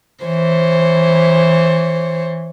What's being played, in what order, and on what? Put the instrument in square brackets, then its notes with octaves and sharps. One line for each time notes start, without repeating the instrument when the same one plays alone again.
[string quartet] E3 C5 C#5